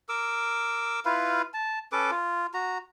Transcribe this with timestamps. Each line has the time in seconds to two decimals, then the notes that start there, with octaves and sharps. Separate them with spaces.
0.09 A#4 D6 E6
1.05 E4 F4 B4 F5
1.54 A5
1.92 C#4 A4 B4 D6
2.11 F4
2.54 F#4 A#5